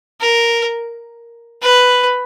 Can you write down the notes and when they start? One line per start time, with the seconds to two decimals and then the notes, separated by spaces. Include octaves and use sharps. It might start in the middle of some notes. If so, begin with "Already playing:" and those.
0.21 A#4
1.62 B4